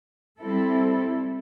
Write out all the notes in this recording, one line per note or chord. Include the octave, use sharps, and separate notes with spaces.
G3 C4 E4 A4